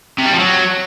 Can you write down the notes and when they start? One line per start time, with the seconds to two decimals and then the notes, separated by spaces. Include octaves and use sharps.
0.19 C3
0.25 G3
0.32 F3
0.39 F#3